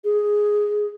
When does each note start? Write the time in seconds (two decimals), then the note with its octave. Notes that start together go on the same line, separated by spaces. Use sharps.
0.04 G#4